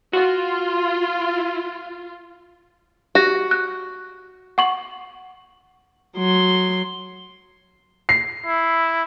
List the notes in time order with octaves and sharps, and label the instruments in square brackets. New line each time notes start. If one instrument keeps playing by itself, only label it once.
[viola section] F4 [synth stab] F#4
[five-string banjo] F#4 [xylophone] G4 A#6
[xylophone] F#6
F#5 C#6 F#7
[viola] F#3 C6
[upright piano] C7
[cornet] E4